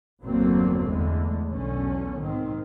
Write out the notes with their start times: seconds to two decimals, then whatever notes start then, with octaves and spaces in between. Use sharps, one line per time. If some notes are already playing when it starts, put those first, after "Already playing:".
0.23 G1 E2 D3 F#3 A#3 C4
0.87 E2 D3 G#3 A3
1.50 B1 E2 D3 C#4
2.22 G#2 D#3 C4